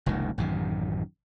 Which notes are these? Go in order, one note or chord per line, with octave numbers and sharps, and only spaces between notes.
F1 C#2 A#2 D#3
A1 F#2 C3 D#3